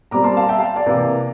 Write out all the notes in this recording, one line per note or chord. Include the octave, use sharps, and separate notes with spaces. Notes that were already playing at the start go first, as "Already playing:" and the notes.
A#2 G3 C4 A#5 D6
A5 C6
F5 A5
E5 G5
F5 A5
D5 F5
C3 E3 A#3